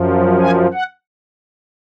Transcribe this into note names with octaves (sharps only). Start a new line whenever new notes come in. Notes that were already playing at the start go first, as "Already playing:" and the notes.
Already playing: F#2 F3
G#5
F#5